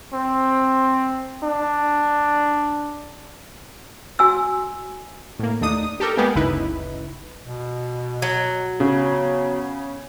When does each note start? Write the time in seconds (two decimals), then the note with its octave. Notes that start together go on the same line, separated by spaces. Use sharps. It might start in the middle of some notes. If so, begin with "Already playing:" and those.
0.13 C4
1.43 D4
4.19 F#4 G#5 E6
5.39 A2 A#3
5.61 D#2 A3 D4 D#4 D#6
6.00 G4 A4 A#4
6.17 G#3 A#3 B3 G4 G#4
6.35 G1 D2 C#3 D#4 E4 B4
7.45 B2
8.22 F#3
8.80 C#3 B3